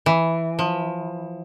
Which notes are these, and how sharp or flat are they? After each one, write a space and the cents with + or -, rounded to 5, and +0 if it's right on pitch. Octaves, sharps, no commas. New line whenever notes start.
E3 +0
F3 +25